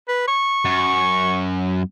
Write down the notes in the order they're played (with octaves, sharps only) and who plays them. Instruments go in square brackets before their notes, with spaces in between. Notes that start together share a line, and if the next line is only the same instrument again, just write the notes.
[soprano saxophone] B4
C#6
[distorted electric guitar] F#2